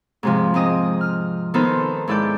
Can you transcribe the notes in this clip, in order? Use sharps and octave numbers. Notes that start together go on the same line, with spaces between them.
G#2 C3 F3
G#2 C4 D#5 D#6
F6
D#3 B3 D#4 A4 C5
G#2 E4 A4 D5 G6